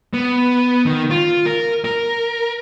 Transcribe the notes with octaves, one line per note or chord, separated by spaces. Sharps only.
B3
D#3
F4
A#4
A#4